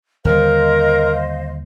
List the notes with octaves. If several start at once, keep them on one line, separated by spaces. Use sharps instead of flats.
D#2 D3 G3 A#4 C5 D#5 F5